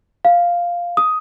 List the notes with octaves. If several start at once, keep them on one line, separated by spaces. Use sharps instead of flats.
F5
D#6